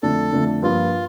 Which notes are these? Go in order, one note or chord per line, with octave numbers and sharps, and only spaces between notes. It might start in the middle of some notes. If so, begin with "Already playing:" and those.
F2 D3 A3 D4 A4
F2 D3 A3 D4
G2 F3 A#3 F4